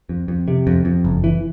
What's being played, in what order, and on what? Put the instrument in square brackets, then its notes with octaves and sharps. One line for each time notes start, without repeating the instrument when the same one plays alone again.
[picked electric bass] F2
F2
C3
F2
F2
F#1
E3